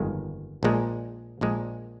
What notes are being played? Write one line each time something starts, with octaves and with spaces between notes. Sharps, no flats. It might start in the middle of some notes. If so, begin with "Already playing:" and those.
Already playing: G1 F2 D#3 G#3
A#1 A#2 G#3
A#1 A#2 G#3